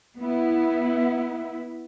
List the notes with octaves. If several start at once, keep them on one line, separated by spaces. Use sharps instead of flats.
B3 E4